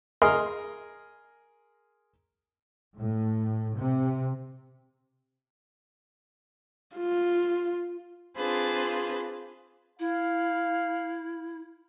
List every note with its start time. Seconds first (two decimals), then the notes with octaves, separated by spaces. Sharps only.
0.22 G#4 A#4 D#5 C6 F6
2.98 A2
3.76 C3
6.96 F4
8.36 C4 D4 F4 G#4 B4 C5
9.99 E4 F5